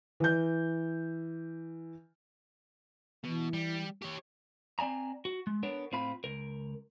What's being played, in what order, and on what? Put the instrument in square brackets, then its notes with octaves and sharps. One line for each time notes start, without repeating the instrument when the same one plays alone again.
[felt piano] E3 G6
[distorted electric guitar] B2 [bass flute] E3
[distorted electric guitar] G3
G4 C#5
[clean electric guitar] C4 D5 G#5 A#5
F#4
G#3
B3 D4 A#4 C#5
A2 C4 F4 B5
C#2 A#4